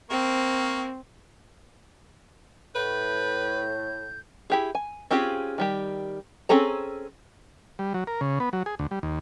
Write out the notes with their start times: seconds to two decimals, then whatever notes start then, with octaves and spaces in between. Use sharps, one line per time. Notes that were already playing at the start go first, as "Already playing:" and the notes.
0.10 A#3 C4 C#6
2.75 A2 B4 G6
4.50 E4 G4 G#4
4.75 G#5
5.10 C4 C#4 F4 G4 G#4
5.58 D#3 G3 G4
6.49 C4 C#4 G#4 A4 A#5
7.79 G3
7.94 F#3
8.07 A#4
8.21 C#3
8.40 B3
8.53 F#3
8.66 G#4
8.79 D2
8.91 G3
9.03 D#2